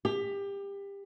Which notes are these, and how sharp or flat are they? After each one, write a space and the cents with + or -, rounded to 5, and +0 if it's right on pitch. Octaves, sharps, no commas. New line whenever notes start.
G4 +25